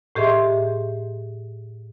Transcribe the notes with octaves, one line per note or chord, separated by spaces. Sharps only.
A2 G4 G#4 D#5 E5 C6